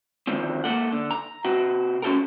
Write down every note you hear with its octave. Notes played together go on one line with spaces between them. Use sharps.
D3 D#3 F3 C4
A#3 A4 F#5
D3
A#5
C3 F#4
C#4 F#4 A4 A#4